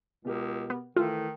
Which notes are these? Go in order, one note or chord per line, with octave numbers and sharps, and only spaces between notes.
C#2 B2 G4 A#4
B3
D#3 E3 A3 F4 E6